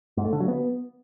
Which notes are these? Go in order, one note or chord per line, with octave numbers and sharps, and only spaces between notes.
G#2
A3
D3
F#3
B3